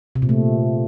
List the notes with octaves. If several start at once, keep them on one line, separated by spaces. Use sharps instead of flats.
C3
A#2
A3